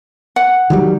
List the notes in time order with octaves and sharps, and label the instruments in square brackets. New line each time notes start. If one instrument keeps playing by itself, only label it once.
[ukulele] F#5
[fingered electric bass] D#3 F#3 G3